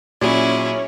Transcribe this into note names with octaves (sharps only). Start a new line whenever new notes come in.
A#2 F#3 C#4 E4 G#4 C#5 D5